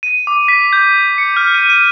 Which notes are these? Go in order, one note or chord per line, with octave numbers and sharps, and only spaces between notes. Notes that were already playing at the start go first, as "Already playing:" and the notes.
D#7
D6
B6
G6
C#7
F6
D#7
D#7